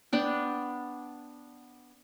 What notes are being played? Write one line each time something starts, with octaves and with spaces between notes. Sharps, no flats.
B3 D4 G5